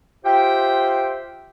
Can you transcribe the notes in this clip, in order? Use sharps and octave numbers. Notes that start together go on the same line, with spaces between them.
F4 G4 C5 E5 G5